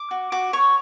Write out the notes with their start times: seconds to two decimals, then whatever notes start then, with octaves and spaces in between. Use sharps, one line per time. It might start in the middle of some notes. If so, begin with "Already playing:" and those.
Already playing: D6
0.11 F#4
0.32 F#4 D6
0.53 C#5 C#6